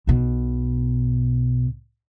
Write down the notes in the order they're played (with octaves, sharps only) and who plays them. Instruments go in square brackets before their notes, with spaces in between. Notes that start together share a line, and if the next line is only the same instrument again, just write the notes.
[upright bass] B1 B2